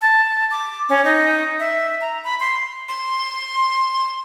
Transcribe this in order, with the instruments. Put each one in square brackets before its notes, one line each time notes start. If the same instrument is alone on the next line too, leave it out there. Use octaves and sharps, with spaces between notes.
[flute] A5
D6
C#4
D#4
E5
A#5
B5
C6
[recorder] C6